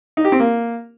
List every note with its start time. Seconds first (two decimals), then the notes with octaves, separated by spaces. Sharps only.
0.17 D#4
0.25 G4
0.32 C4
0.40 A#3